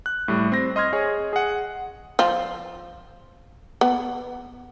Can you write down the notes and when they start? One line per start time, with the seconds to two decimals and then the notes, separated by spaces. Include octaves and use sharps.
0.06 F#6
0.28 A2 G3
0.52 C4 A#6
0.76 D#5 C6 F6 G#6
0.93 G#4 C#5 D#5
1.33 G#4 F#5
2.19 F3 F4
3.81 B3